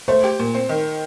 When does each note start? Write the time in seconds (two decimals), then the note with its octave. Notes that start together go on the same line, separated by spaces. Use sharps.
0.08 A3 C5
0.24 G4
0.39 A#2
0.54 C4
0.69 D#3